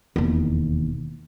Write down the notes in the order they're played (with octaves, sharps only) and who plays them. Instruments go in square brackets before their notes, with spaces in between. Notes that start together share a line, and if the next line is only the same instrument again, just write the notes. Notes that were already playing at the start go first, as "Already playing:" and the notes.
[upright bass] E1 D#2